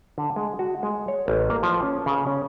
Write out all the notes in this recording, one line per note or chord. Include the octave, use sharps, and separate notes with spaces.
D3
G#3
F#4
G#3
C#5
A1
A#3
F3
C#4
C#3
C#4